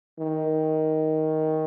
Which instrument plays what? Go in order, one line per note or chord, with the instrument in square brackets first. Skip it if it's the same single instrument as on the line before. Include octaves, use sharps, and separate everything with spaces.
[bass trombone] D#3